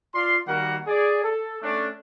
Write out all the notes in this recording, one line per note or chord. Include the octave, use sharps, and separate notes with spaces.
F4 D5 F5 C6
D#3 G3 A#3 F#4 A#4 F#5
G#4 D5
A4
A3 C#4 D4